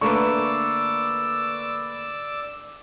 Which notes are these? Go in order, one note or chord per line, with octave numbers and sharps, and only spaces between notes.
D3 A3 A#3 B4 D5 C#6 E6